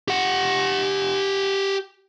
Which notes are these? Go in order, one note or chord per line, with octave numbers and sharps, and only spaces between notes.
G4 F#5